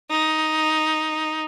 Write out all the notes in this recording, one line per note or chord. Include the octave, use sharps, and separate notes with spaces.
D#4